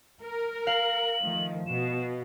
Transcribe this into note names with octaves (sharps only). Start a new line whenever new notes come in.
A#4
F5 F#7
D#3 F3 A3
B2 E7